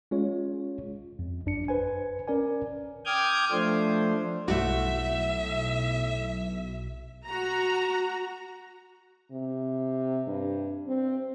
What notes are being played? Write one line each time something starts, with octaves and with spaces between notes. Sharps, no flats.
G#3 C#4 F4 C#5
F2
G#1 F#2 D4 C#7
B4 C5 G#5
C#4 A#4 D5 G#5
G5 D6 D#6 F6 G6 G#6
F3 A3 D4 C5
B1 A2 A3 F#4 E5
F#4 A#5
C3
G2
C4